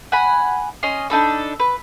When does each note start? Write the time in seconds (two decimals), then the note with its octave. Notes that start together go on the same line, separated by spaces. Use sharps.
0.12 F#5 G#5 B5
0.83 C#4 D#5 C6
1.10 D4 D#4 A4 B5
1.59 B4